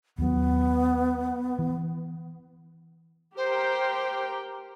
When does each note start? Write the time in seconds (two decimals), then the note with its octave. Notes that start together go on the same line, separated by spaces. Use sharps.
0.18 D#2 F#3 B3
1.59 E3
3.37 G4 A#4 C5 G5